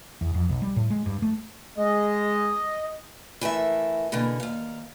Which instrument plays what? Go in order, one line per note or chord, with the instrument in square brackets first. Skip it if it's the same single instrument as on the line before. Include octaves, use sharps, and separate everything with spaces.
[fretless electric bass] E2
F2
B1
G3
A2
G#3
G2
A3
[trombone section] G#3 [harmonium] D#5
[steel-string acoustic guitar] E3 A3 A#4 E5
B2 D3 E3 A#3
D#2 F5